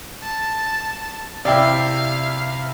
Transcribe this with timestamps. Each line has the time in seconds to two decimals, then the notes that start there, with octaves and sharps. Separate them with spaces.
0.22 A5
1.45 C3 E4 D5 F5 G5